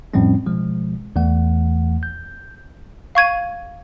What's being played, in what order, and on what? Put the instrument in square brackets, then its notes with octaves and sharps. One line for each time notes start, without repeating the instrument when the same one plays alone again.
[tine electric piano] F2 A2 F3 G3 C4 C#4
B2 F3 G#3
E2 E3 A3 F#5
G6
[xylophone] F5 C#6 G#6 D#7